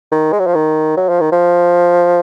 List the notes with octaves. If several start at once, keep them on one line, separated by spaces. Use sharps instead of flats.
D#3
G#3
F#3
F3
D#3
F#3
F3
D#3
F3